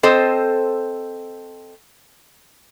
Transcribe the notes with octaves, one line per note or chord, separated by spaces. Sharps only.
C4 A4 C5 D#5